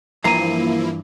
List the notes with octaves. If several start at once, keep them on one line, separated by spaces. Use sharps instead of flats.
G2 E3 F3 A#3 E4 A#5 C7 D#7